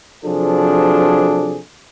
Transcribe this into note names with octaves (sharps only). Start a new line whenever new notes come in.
C3 F3 F#3 D4 G#4 A4